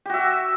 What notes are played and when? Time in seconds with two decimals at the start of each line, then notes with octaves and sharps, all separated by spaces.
0.06 G4
0.10 F#4
0.14 E5